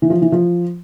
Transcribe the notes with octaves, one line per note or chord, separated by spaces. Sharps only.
E3
F3
E3
F3